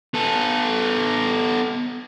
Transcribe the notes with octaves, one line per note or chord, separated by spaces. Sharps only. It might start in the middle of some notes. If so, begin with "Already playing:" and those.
B3 A4